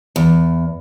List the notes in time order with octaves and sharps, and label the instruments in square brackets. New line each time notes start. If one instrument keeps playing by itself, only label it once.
[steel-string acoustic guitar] E2